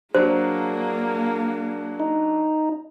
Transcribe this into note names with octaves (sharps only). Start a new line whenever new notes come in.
F#3 A#3 D4 G#4 C5
D#4